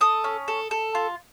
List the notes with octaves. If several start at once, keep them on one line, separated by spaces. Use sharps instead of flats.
A4 D#6
C#4
A4
A4
F4